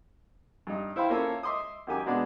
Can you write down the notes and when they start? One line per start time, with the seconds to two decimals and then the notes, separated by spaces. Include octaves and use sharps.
0.67 G2 D#4
0.96 E4 C5 F5 G5 B5 C6
1.10 A#3 C#4 F4 A4 C#5 E5
1.43 D#5 E5 C6 D6 D#6
1.87 F#2 D#3 G4 G#5 D6
2.06 B2 G#3 B3 D4